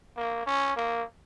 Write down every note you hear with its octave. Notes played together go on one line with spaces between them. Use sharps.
A#3
C#4
A#3